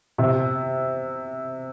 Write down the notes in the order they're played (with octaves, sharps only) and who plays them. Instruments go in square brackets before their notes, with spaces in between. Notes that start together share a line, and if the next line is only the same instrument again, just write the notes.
[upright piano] C3